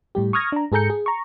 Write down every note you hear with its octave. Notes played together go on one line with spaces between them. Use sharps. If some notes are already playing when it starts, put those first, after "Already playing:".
A2 G3 G4
C#6 D#6 F6 G#6 A#6
D4 A#5
G#2 G#4 A4 A#5 G6 C#7
G#4
A#5 C#6